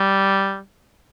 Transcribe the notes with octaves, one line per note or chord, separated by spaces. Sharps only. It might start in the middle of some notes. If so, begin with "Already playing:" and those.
Already playing: G3